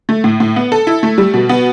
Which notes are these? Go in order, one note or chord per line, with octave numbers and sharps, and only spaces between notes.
A3
A2
A2
B3
A4
E4
A3
G3
B2
B3